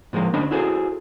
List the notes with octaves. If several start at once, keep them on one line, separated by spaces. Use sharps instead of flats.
A2 F3 G#3 A#3
D2 C#4 D4 C5 D#5 B5
E4 F#4 G#4 A4 C5